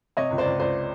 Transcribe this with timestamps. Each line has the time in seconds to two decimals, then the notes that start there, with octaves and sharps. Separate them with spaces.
0.17 C3 C#5 D#5
0.31 C#2
0.38 C5 D5
0.46 C#2
0.60 C#2 C5 D5